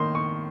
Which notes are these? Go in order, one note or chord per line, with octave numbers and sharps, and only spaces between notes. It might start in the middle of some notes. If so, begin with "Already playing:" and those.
Already playing: D#3 A#3 D#4 C6
C#6